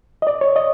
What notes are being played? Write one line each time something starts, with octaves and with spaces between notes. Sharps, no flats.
D#5
D5
C#5
D#5